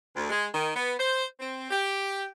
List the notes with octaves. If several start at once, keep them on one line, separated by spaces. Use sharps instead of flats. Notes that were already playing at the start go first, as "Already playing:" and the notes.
D2
G#3
D#3
B3
C5
C4
G4